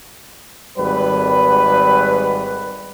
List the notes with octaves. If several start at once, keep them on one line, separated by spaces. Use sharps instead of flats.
G#1 G3 B4